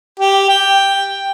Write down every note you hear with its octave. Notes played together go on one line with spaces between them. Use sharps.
G4
G5